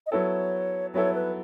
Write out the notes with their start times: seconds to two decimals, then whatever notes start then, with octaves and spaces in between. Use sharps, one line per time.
0.07 D#5
0.12 F#3 B3 E4 A4 C#5
0.94 F#3 B3 E4 A4 C#5
1.15 B4